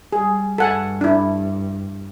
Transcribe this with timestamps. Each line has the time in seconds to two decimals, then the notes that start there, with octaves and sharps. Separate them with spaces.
0.13 G3 G#4
0.58 G2 A4 F#5 G#5
1.01 D4 E4